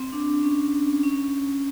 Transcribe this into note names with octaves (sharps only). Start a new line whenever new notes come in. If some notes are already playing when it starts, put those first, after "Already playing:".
Already playing: C4
D4
C#4
C#4